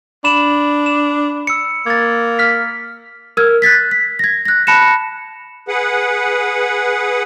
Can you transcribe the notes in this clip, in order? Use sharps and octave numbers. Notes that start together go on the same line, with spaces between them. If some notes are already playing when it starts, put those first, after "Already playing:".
D4 B5 E7 F#7
E7
E6 C#7
A#3 G#6 A6
F6 B6
A#4 E6 F6 G#6
F#6 G#6 A6 B6
B6
G#6 A#6
F#6 A#6
A5 B5 F#6 A#6 C#7 E7
G#4 B4 F#5